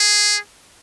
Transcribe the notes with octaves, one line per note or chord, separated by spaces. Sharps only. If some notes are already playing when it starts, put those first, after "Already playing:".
Already playing: G#4